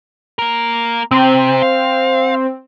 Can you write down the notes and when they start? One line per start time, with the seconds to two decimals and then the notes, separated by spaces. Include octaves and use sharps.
0.39 A#3 A#4
1.11 C3 C4
1.62 F5